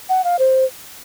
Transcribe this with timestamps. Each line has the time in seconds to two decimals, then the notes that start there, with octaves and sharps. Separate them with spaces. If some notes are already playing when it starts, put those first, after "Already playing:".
0.09 F#5
0.24 F5
0.39 C5